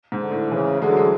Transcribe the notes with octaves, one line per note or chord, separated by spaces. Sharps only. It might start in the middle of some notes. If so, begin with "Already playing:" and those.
G#2
D3
A2
C#3 E3
D3 G#3
F#3
G#3